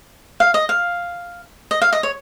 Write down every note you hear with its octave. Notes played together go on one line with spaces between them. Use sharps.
F5
D#5
F5
D#5
F5
D#5
C#5